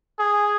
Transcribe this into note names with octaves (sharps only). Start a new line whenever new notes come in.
G#4